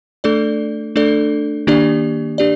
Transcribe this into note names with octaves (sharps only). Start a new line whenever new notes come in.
A3 D4 A4 D5
A3 D4 A4 D5
D#3 A#3 D4 G4 D5
D4 G4 D5